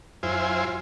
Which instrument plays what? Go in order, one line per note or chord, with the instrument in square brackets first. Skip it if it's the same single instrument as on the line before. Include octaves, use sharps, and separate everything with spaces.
[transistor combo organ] F#2 E4 F4 C5 G#5